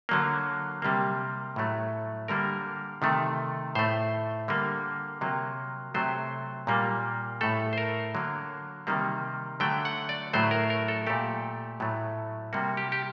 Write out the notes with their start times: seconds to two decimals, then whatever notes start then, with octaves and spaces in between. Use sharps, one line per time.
0.09 D3 F#3 A#3
0.82 C3 G3 A#3
1.56 A2 F#3 A3
2.28 D3 G3 A#3 A#4
3.02 C3 D#3 A3
3.75 A2 A3 C5
4.48 D3 G3 A#3
5.21 C3 F#3 A#3
5.94 C3 F#3 A3 C5
6.67 A#2 G3 A#3
7.41 A2 A3 A4
7.73 C5
7.78 A#4
8.15 D3 F#3 A#3
8.87 C3 D#3 G3 A#3
9.60 D3 F#3 A3 G5
9.85 F#5
10.09 D5
10.33 A2 F#3 A3 C5
10.51 A#4
10.70 A#4
10.88 A4
11.07 A#2 A3 G4
11.80 A2 F#3 A3
12.53 C3 G3 A#3 F#4
12.77 G4
12.92 G4